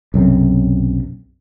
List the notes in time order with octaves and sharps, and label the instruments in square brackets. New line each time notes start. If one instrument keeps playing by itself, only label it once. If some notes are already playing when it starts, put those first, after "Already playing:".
[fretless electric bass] B1 F#2 C3